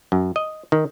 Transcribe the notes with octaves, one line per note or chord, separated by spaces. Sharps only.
F#2
D#5
D#3